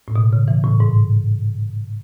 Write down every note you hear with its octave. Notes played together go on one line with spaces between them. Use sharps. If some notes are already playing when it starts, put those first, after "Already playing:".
A2
B2
C#3
E3
A2
G#2